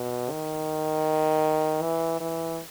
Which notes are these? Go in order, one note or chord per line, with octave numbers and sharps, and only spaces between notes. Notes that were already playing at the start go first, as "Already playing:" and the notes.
Already playing: B2
D#3
E3
E3